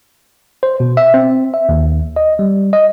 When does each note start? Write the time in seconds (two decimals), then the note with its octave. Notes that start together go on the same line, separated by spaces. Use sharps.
0.63 C5
0.80 B2
0.97 E5
1.14 C4
1.54 E5
1.69 D#2
2.16 D#5
2.39 G3
2.73 D#5